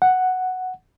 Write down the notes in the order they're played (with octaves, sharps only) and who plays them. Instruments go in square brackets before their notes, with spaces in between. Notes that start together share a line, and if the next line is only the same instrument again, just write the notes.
[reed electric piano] F#5